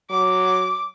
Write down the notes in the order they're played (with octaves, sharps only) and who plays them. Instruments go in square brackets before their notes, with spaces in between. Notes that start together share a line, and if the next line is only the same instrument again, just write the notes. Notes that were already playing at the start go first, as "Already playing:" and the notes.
[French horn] F#3 [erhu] D6